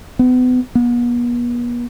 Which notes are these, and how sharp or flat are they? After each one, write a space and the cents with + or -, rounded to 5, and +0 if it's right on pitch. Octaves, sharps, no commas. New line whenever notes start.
B3 +30
B3 -40